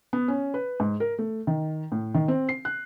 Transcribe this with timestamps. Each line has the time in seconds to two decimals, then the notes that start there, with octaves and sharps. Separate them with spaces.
0.13 B3
0.28 C#4
0.54 B4
0.80 G#2
1.00 A#4
1.18 A3
1.47 D#3
1.92 A2
2.15 D#3
2.28 C4
2.49 C7
2.65 F#6